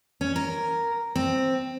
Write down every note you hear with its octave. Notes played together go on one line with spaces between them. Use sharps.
C#4
A#4
C4